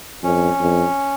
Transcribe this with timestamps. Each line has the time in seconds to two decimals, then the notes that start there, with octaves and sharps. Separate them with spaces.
0.23 F2 C#4
0.60 F2